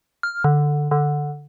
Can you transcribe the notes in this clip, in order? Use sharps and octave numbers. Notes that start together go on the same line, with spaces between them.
F6
D3
D3